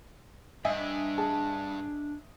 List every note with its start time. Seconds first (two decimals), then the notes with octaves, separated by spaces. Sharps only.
0.65 G2 D4 D#5 E5 G#5
1.18 G#4 A5